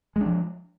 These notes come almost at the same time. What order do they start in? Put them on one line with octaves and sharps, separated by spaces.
G#3 D4 F3